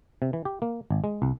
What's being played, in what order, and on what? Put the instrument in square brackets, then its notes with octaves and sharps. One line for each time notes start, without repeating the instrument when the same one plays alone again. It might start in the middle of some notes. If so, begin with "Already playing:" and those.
[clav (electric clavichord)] C3
E3
G4
A#3
G#1
G#3
C2